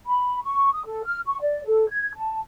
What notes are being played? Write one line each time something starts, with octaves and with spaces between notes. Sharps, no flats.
B5
C#6
D#6
A4
F6
C#6
D5
A4
G#6
A5